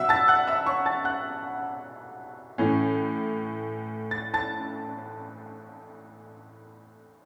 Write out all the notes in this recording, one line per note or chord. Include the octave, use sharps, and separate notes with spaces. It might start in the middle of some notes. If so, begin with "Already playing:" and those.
Already playing: B2 F#3 E5 F#5 E6
A5 A6
F#5 F#6
E5 E6
C#5 C#6
A5 A6
F#5 F#6
A2 E3 C#4
A6
A5 A6